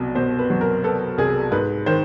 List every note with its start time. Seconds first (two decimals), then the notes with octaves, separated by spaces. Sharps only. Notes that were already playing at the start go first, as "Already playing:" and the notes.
Already playing: C2 B2 F#3 B3
0.15 B2 C5
0.39 B4
0.50 F#3
0.61 A#4
0.83 B3 A4
1.18 C2 G#4
1.51 G#2 B4
1.86 D#3 C5